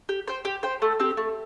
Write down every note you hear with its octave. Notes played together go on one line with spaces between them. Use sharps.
G4
C5 G5
G4
C5 G5
A3
C4 G4
A3